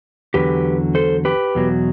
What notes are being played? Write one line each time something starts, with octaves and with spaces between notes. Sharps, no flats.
E2 D3 F#3 G4 B4
A4 C5
G4 B4
E2 B2 F#3